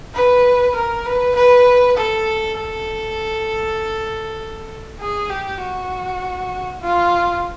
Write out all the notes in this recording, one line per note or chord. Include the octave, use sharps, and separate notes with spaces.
B4
A#4
B4
B4
A4
A4
G#4
G4
F#4
F4